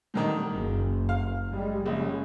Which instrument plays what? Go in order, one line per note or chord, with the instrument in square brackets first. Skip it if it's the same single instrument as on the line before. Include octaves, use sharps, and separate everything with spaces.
[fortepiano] A2 D3 D#3
[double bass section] F#1
[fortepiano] F5
[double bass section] G3 G#3
[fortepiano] A#1 [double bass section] C#3